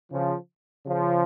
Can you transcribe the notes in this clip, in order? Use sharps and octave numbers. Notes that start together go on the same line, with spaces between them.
C#3 F3
C#3 F3